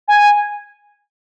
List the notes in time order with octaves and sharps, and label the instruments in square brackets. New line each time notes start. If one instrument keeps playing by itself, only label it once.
[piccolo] G#5